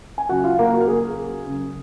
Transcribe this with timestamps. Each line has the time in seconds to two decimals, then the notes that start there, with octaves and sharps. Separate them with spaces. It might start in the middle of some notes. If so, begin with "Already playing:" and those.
0.18 G#5
0.29 C#3 F#3 F#4 F#5
0.44 F4 F5
0.59 A#3 A#4
0.73 F#4
0.81 A#4
0.88 G#4
1.46 C#3 F#3